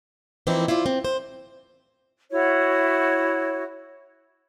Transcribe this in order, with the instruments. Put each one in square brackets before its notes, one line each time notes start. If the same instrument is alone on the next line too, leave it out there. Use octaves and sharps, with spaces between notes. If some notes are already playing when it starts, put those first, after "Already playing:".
[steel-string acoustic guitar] E3 F3 A#3 C4 D#4 E4
E4 F4 C5 D5
C4
C5
[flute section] E4 F#4 C#5